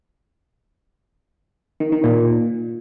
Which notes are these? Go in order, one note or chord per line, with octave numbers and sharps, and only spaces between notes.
D#3
D#3
A#2